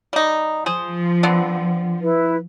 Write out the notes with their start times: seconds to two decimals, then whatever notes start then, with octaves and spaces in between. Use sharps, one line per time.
0.13 G3 D#4
0.66 F3 G#4 C5
1.23 D3 B3 C4
2.02 E4 B4